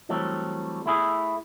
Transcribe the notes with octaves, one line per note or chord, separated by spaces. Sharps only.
E3 F#3 G3 A3 C4
A3 E4 G#4